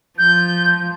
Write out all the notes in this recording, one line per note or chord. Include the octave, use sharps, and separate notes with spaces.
F3 G6